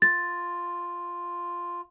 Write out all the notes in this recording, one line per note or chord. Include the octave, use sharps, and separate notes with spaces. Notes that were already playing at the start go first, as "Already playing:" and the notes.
F4 A6